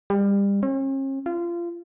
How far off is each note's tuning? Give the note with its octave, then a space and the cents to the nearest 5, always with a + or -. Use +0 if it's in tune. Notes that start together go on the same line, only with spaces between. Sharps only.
G3 +30
C#4 -45
F4 -25